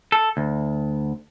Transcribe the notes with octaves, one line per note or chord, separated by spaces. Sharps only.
A4
D2